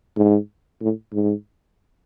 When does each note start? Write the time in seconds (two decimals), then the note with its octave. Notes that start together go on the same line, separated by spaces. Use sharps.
0.17 G#2
0.81 A2
1.13 G#2